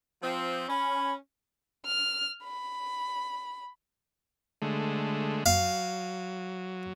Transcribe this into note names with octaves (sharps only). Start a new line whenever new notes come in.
F3 C4
C#4 B5
F6
B5
D3 G#3 A3
F#3 F5